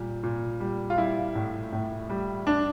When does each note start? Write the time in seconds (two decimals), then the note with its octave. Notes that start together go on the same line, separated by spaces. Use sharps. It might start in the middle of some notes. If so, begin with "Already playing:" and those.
Already playing: A#2 G3
0.23 A#2
0.60 G3
0.90 F4
0.97 G3 E4
1.35 A2
1.73 A2
2.10 G3
2.47 D4